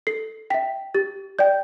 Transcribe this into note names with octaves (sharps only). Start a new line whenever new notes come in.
A4 C7
E5 G5 B6
G4 A6
D5 G5 G6